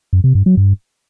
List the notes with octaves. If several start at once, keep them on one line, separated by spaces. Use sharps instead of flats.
F#2
C3
G2
F#3
G2